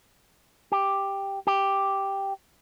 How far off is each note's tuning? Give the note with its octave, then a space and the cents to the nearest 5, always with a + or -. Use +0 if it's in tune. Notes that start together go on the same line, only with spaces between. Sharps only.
G4 +5
G4 +0